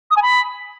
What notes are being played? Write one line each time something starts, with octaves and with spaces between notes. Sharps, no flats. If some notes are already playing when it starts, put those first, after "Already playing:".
D#6
G#5
B5